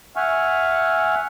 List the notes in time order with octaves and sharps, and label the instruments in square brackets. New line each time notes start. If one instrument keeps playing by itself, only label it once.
[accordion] E5 F#5 G#5 C#6 F6